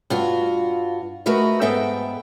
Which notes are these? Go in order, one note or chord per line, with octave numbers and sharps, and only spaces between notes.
G2 F4 F#4
A3 F#4 A#4 B4 D#5
G#2 B3 A4 E5 G5